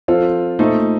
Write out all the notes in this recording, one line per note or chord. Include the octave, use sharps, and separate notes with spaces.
F3 C4 F4 A4 C5
A#2 A3 D#4 A4 C5